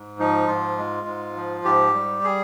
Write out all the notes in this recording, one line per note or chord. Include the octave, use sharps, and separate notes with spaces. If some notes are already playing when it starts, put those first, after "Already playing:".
Already playing: G#2
F3 D#4
G#2 F4
G#3
G#2
F3
G#2 G4
G3
G#4